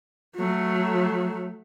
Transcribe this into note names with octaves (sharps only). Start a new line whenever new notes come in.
F#3 A3